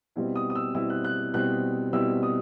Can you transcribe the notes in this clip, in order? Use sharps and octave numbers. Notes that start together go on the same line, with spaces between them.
B2 G3 C4 E4
D#6
D#6
E6
B2 G3 C4 E4 E6
F#6
F#6
B2 G3 C4 E4 F#6
B2 G3 C4 E4 E6
D#6